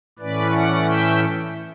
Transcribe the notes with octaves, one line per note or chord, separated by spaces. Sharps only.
A2 E3 A3 C#4 B4 D5
D5 F#5
E5 G5